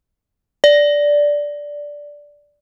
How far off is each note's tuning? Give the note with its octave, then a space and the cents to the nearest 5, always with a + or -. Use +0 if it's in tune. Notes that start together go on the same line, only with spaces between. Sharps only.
D5 -5